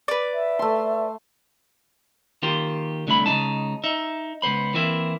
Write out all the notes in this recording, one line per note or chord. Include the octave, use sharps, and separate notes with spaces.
B4 D5
E5
A3 C6
D#3 A#3 F4 G4 C5
C2 D3 A3 E4 B5
C#2 C#3 G#3 C#4 D#4 A5
D#4 E5
C#2 B3 C5 B5
E3 A#3 C4 E4 E5